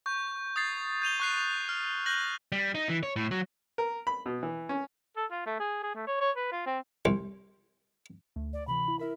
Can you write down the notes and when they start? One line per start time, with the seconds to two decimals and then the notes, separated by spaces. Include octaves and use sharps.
0.06 C#6 G6
0.56 D#6 G#6 A6 C7
1.02 G6 D#7 F7 G7
1.20 C#6 F#6 C7
1.69 F6
2.06 F#6 G6 A#6 F#7
2.52 G3
2.75 D#4
2.89 E3
3.03 C#5
3.16 A2
3.31 F#3
3.78 A#4
4.07 B5
4.26 B2
4.43 E3
4.69 C#4
5.17 A4
5.31 F4
5.46 A3
5.60 G#4
5.83 G#4
5.95 A3
6.07 C#5
6.21 C#5
6.36 B4
6.52 F4
6.66 C4
7.05 C2
8.36 D2 A3
8.53 D5
8.67 C3 E3 B5
8.88 E4
8.99 E4 A#4 E5 B5